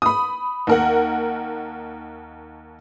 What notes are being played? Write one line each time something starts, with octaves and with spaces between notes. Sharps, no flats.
B5 D#6
D#2 A#4 F#5